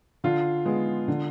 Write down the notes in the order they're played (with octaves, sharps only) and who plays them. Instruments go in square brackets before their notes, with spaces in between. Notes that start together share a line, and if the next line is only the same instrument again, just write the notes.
[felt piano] D3 [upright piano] F4
[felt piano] G#3 B3
D3